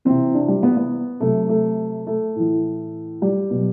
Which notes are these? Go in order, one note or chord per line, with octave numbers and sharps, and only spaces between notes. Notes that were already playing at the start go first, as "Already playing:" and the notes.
C3 E3 C4
D4
G3
B3
B3
C3 F#3 A3
A3
A3
A2 E3
G3
B2 F#3